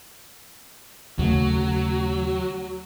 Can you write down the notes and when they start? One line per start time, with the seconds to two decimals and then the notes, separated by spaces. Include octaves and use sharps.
1.19 D#2 C#3 F#3 A3